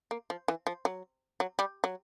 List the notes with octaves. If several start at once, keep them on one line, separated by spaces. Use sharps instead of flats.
A#3
F3
E3
F3
F#3
F#3
G3
F#3